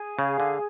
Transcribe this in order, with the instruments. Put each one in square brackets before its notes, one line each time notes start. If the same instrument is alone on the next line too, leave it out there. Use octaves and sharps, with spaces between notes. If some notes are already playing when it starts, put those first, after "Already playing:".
Already playing: [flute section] G#4
[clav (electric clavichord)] C#3 [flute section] F5
[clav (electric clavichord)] D3